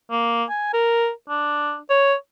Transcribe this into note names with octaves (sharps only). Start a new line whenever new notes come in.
A#3
G#5
A#4
D4
C#5